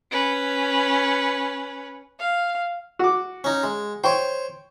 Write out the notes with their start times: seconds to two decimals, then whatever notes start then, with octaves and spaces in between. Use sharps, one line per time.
0.11 C#4 B4
2.19 F5
2.99 F#4 D6
3.44 C#4 D#4
3.63 G#3
4.04 C5 C#5 G5 C#6